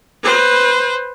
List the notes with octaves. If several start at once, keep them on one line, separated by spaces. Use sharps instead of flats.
B4 C5